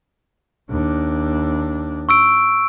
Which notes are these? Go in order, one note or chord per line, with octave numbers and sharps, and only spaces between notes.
D#2 D4
C#6 E6 D7